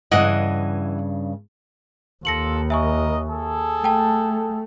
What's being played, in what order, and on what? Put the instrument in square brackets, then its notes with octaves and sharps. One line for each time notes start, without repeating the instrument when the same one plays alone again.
[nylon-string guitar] G2 A#2 C#3 [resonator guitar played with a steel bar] E3 D#5 F#5
[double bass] D#2 [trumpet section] F4 A4 [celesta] A#6 C#7 F#7
[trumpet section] A#4 D#5 [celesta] E5 G#5 C#6
[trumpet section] G#4 A4
[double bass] A3 [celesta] G5 A5